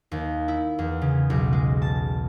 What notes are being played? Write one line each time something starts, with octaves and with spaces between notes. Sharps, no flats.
D#2
E4
E2
C#3
B1
G#3
A5